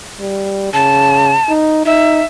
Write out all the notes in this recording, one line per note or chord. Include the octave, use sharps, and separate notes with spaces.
G3
C#3 A5
D#4
D#4 E5